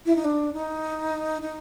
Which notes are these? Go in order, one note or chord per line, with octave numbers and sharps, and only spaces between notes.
E4
D#4
D4
D#4
D#4